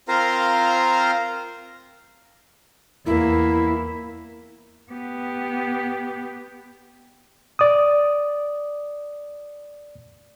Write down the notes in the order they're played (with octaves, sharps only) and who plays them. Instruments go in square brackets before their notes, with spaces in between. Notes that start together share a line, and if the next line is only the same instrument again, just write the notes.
[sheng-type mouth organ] C4 F4 A#4 C5 F5 A#5
[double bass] E2 A#3 [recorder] E4
[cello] B3 G4
[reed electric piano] D5 D#6